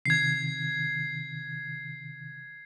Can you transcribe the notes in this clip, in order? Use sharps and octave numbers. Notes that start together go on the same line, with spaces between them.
C3 D#3 G#6 C7